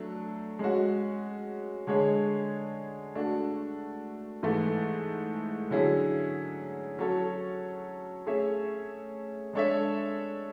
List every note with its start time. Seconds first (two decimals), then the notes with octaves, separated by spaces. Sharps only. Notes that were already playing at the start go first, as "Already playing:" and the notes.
Already playing: F#3 A3 D4
0.59 G#3 C#4 F#4
1.87 D3 G#3 D4 G#4 C#5
3.15 A3 D4 F#4
4.43 G#2 E3 A3
5.71 D3 F#3 C#4 E4 G#4
6.98 F#3 C#4 F#4 A4 C#5
8.26 A3 C#4 G#4 C#5 E5
9.53 G#3 D4 A4 C#5 E5